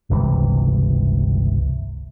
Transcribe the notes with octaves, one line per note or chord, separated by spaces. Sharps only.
G1 C#2 C3 E3